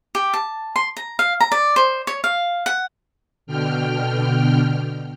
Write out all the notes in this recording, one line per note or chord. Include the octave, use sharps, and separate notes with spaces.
G4
A5
C6
A#5
F5
A#5
D5
C5
C#5
F5
F#5
B2 D3 G5 F6